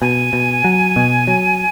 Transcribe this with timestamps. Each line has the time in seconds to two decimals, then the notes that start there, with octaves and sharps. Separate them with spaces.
0.01 B2 G#5
0.33 B2
0.64 F#3
0.96 B2
1.27 F#3